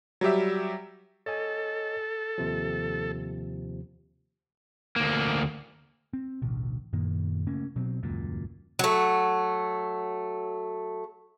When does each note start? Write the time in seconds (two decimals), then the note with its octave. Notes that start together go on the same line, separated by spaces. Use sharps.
0.21 F#3 G3 G4 E5
1.26 A4 C#5 D#5 G#5
2.38 D#2 C3 F3
4.96 D2 A#3
6.13 C4
6.42 A1 D2 B2
6.93 F#2 A#2 D#3 A#3
7.47 C#3 A3 A#3 C#4
7.76 B2 F#3 C4
8.03 D#1 C#2 F#2 A#2
8.79 F#3 A3